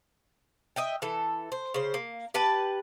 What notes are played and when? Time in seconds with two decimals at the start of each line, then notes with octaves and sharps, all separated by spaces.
0.76 D#5 E5 G5
1.02 E3 A4
1.52 C5
1.74 C#3 C5
1.94 A#3
2.34 G4 B4 A5